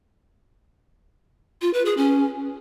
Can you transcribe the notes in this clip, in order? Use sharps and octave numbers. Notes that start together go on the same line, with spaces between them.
F4
B4
G#4
C#4